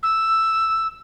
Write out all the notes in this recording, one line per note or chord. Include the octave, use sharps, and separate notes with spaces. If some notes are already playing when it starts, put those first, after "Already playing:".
E6